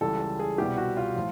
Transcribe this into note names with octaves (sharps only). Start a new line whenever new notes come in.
C#2 C#3 E3 G3 A4
A4
G#4
C2 B2 G3 G4
F#4
F4
A2 F3